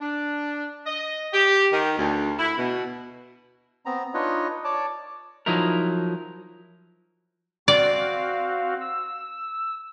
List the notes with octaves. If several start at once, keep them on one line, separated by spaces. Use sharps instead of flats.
D4
D#5
G4
D#3
D2
E4
B2
B3 C4 A#5
D4 D#4 F4 B4 C#5 D#5
C#5 D5 A5 D6
F3 F#3 D#4 E4 A#4
C4 F#4 D5 F5
E6